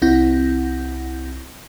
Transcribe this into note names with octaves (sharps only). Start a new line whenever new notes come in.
C2 C4 E4 F#5 G6 A#6